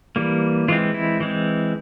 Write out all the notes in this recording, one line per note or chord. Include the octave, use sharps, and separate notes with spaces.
E3 G3 A#3
E3 G#3 C4 F4
E4
E3 G#3 C4